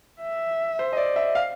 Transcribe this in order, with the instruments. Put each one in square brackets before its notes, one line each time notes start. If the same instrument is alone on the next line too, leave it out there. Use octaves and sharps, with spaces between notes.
[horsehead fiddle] E5
[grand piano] C5
D#5
D5
E5
F5